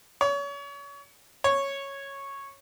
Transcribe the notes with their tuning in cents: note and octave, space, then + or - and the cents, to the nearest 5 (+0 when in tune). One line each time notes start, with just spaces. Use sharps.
C#5 +35
C#5 -5